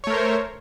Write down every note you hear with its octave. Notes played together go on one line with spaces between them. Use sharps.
A3 A#4 C5 C#5